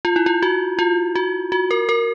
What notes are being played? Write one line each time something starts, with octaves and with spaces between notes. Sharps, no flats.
F4
E4
F4
F#4
F4
F#4
F#4
A#4
A#4